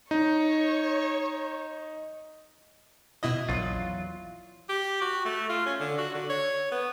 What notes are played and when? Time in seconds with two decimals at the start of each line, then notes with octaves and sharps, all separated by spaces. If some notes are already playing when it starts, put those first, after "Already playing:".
0.11 D#4 C#5
3.23 B2 E4 D#5
3.49 A#1 E2 F#3 F4
4.69 G4
5.01 F#4
5.25 A3
5.49 F4
5.66 C#4
5.80 D3
5.98 F#4
6.15 D3
6.29 C#5
6.72 B3